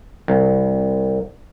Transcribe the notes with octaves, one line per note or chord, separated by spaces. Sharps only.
C2